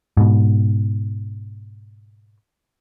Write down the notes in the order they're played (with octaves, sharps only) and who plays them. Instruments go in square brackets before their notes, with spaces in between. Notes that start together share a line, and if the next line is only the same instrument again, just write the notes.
[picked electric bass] G#2 B2